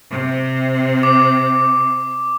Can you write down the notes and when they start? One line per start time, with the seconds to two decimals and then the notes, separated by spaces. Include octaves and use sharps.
0.11 C3
1.03 D6